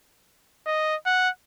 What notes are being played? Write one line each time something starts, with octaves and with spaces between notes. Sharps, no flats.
D#5
F#5